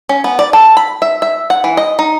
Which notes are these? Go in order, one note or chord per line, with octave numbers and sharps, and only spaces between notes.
C#4
B3
D5
A4
B5
E5
E5
F#5
E3
D#5
D#4